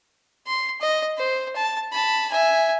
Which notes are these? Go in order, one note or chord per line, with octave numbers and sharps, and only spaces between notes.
C6
D#5
C5
A5
A5 B5
E5 G#5